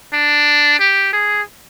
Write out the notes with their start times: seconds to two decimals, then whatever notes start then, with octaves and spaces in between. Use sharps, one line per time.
0.13 D4
0.80 G4
1.13 G#4